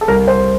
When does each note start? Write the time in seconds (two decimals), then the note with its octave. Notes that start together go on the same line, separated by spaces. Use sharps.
0.01 A4
0.08 C2 A#4
0.28 C5